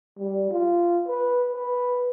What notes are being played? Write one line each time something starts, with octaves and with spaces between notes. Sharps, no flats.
G3
F4
B4
B4